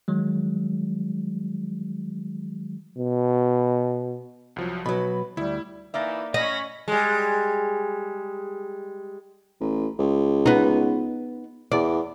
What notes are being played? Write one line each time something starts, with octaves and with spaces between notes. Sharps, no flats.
D#3 F#3 G#3
B2
C2 F3 F#3
B2 F#3 B4 B5
D2 G3 E4
E3 A#3 D#4 D5 E5
C#4 D#5 B5 A#6
G3 G#3
A1
C#2
B3 D#4
E2 D5